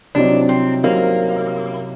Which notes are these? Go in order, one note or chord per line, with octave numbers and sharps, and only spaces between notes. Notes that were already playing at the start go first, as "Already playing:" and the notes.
C2 C3 F#3 C4 D4 D#4
C4
C3 F#3 A#3 C4 D#4